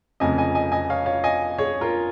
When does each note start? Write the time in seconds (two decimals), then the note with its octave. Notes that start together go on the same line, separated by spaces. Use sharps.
0.20 F1 F2 C#3 D#5 G#5
0.38 D#5 G#5
0.55 D#5 G#5
0.72 D#5 G#5
0.90 C#5 F5
1.06 C#5 F5
1.24 D#5 G#5
1.58 G#4 C#5
1.81 F4 A#4